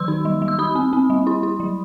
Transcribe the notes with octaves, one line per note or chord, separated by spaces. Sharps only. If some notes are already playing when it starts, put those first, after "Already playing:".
Already playing: D#3 F#3 C6 E6
D#4
G3
G3
E6
D#4 B5 D#6
C4
C4
G3
E4
E4
F#3